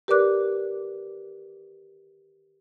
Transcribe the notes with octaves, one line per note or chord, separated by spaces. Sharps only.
G4 A#4 B4 D5 D6 F#6